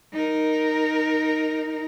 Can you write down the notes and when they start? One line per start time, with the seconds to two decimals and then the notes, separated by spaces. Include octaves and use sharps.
0.13 D#4 A#4